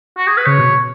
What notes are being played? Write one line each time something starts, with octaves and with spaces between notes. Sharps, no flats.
F#4
G#4
B4
C#3 C#5
B2